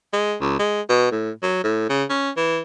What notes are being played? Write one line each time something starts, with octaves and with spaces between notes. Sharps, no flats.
G#3
C#2
G#3
B2
A2
F#3
A2
C#3
C#4
E3